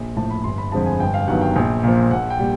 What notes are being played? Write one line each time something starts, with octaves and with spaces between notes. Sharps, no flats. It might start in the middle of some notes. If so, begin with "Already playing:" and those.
Already playing: A#1
A2 F3 A5
B5
G1 C6
B5
F2 D3 F3 G#3 A5
G#5
G1 G5
F5
G2 D#3 F#3 B3 F#5
G5
A#1
A#2 F3
A#1 F#5
G5
A#2 G3